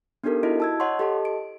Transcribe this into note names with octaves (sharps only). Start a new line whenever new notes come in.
B3 D4 D#4 G4 A4 A#4
E4 F#4 D#5 D7
A5 E6 G#6
C#5 D#5 F#5 A5 C6 C#6
G4 A4 D#5 A5
D7